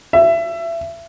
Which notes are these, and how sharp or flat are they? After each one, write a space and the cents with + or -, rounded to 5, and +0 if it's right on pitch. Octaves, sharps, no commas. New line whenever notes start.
E5 +25